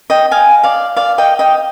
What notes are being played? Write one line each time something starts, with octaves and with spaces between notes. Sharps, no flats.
D#5 G5
F5 G#5
D5 F5
D5 F5
D#5 G5
D#5 G5